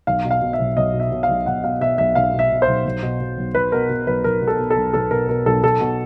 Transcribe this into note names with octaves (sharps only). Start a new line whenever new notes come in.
B1 F5
B2
F5
B2
E5
B1
B1 D#5
B2
E5
B2
F5
B1
B1 F#5
B2 F5
B2 E5
B1 E5
B1 F5
B2
E5
B2
C5
B1
B1
B2
B2
B1
B1 B4
B2 A#4
B2
B1 B4
B1 A#4
B2
A4
B2
A4
B1
B1 A4
B2 A#4
B2 A#4
B1 A4
B1 A4
B2